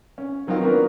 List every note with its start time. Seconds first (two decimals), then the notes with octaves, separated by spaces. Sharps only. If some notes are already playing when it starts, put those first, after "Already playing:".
0.18 C#4
0.47 D#3 F#3 C4 D#4 F4
0.61 A#3 B3 D4 F#4 A#4